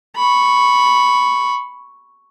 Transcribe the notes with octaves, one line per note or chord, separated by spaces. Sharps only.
B5 C#6